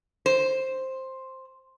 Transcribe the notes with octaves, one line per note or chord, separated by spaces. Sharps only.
C5